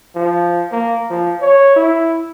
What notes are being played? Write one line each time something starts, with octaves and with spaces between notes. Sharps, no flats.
F3
A#3
F3
C#5
E4